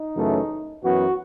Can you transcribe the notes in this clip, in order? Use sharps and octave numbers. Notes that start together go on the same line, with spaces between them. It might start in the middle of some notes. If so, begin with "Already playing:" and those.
Already playing: D#4
F#2 C#3 E3 A3
F#2 E3 B3 F#4